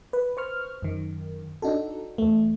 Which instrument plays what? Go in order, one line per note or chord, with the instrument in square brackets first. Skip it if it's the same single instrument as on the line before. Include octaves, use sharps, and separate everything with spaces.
[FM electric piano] B4
C5 C#6 F6
F#2 D#3
D4 D#4 F#4 A4
E2 A3